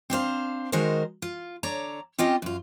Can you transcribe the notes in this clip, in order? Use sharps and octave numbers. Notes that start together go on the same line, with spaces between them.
C4 D4 C5 F5
D#3 G#3 D#4 F#4 A#4 C5
F4
D3 C#5 D5 A#5
C4 C#4 F4 G4 D#5 G5
F#2 F4